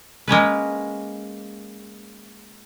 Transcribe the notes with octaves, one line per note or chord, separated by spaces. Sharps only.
G#3 A#3 C#4 B4